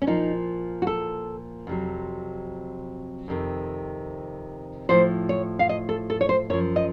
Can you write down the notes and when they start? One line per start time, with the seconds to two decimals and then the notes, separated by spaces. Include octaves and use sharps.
0.02 C#4
0.07 A#2 F3 D#4
0.82 F#4
0.87 A4
1.67 F2 C3 F#3
3.28 F2 C3 D#3
4.89 A2 F3 C5
5.29 C#5
5.59 F5
5.69 D#5
5.89 A4
6.10 A4
6.21 C#5
6.29 C5
6.50 F#2 C#5
6.53 F3
6.76 D#5